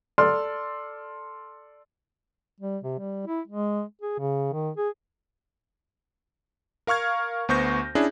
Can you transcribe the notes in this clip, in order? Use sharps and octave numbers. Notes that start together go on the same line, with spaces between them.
A4 D5 C6 F6
G3
C3
G3
E4
G#3
G#4
C#3
D#3
G#4
A#4 F5 C#6 F6 G#6
D2 B3 C5 C#6 G6 A#6
C#4 D4 E4 G#4